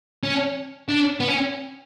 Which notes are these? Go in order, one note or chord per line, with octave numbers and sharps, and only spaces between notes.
C#4
D4
B3
C#4